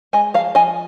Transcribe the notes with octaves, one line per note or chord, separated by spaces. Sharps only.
G#3 D#5 G#5
F3 F5 A#5
F3 D#5 G#5